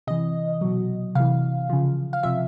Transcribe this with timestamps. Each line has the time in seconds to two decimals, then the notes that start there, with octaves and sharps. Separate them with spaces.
0.07 C3 E3 D#5
0.61 B2 F#3
1.15 C3 E3 F5
1.70 C#3 F3
2.13 F5
2.23 C3 F3 E5